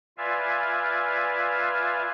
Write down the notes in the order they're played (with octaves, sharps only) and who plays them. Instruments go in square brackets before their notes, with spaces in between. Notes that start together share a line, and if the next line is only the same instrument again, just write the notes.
[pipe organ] F4 B4 D5 E5 F5 G#5